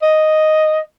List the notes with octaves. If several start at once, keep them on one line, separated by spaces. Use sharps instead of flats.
D#5